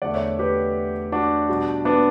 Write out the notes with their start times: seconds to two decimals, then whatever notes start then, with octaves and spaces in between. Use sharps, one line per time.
0.02 E2 D3 A3 D5 F#5
0.14 C#5 E5
0.39 G4 B4
1.12 D4 F#4
1.49 B2 G3
1.85 B3 D4